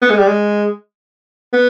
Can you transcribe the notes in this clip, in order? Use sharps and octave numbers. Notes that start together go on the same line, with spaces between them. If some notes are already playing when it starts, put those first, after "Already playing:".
B3
G#3
G3
G#3
B3